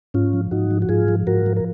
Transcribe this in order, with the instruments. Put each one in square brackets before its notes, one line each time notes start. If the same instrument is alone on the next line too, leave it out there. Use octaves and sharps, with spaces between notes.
[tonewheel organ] G#2 C#4 F4
F3
G#2 D#4 F#4
F3
F#4
G#2 F4 G#4
F3
G#2 F#4 A#4
F3
A#4